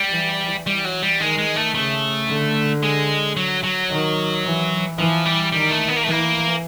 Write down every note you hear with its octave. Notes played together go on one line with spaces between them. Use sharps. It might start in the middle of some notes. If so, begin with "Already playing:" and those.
Already playing: G3
E3
E3 G3
F#3
G3
D#3 G#3
G#3
A3
C#3 A3
D3
G#3
F#3
F#3
D#3
E3
E3 F3
G3
D#3 G3
A3
B3
A#3
A3
E3 A#3